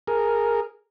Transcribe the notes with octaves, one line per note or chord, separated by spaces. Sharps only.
G#4 A#4